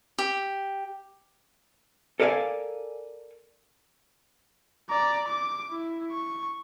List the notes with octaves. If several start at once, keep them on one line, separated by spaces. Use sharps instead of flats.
G4
A4 A#4 D5 D#5 F5 G#5
D5 A#5
D6
E4
C#6